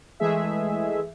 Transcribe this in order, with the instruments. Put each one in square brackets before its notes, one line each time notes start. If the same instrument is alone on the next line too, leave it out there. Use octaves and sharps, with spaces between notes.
[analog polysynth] E3 G#3 A3 G#4 E5